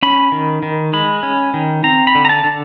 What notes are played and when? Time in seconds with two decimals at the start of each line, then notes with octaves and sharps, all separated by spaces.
0.03 C#4 B5
0.32 D#3
0.63 D#3
0.93 G#3 B5
1.23 C#4
1.54 D#3
1.84 C4 A#5
2.07 B5
2.15 D3
2.25 A#5
2.29 A5
2.44 D3